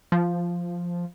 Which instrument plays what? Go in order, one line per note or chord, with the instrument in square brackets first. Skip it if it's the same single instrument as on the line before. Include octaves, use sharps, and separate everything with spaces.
[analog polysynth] F3